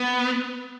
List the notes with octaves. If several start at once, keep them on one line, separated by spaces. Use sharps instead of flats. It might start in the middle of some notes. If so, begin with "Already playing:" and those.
Already playing: B3